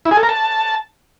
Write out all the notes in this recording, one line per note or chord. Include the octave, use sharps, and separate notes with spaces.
E4
G#4
A4
A#4
A5